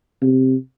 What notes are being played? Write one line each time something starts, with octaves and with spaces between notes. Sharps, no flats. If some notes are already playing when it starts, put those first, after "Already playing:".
C3